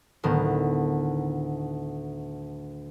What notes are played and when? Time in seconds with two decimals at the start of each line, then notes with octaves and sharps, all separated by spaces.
0.24 D2 A2 D#3 B3